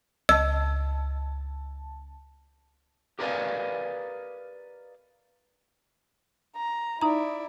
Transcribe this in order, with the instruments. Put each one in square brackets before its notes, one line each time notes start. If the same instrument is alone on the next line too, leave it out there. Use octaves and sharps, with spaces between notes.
[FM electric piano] C#2 A5 [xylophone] D#5 E6
[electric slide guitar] G4 A#4 B4 D5 D#5 F5
[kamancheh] A#5
[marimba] D#4 A#5 [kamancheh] E4 D5